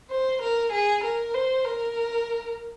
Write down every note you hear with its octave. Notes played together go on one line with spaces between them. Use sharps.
C5
A#4
G#4
A#4
C5
A#4